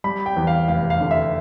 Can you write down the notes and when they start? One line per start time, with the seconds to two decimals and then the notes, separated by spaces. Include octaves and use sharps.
0.04 G3 B5
0.26 G5
0.36 E2
0.47 F5
0.68 F1 F5
0.90 F5
1.01 D3
1.11 E5